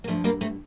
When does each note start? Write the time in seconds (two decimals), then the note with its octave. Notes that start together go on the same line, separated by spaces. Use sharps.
0.04 A#3
0.08 G2 D3 F3 A3
0.24 G3 A#3
0.41 A3 C4